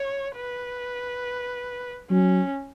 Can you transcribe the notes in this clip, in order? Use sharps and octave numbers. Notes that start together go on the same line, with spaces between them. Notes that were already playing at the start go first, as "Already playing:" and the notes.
Already playing: C#5
B4
F#3 C#4